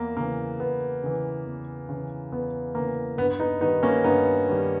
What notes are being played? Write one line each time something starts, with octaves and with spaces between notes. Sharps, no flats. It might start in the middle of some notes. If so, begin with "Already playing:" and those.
Already playing: E2 A#3
C#3 E3 A#3
E2 B3
C#3 E3
E2
C#3 E3
E2 B3
C#3 E3 A#3
G2 B3
B3 D#4
D#3 G3 B3 D#4
A#3 C#4
G2 B3 D#4
D#3 G3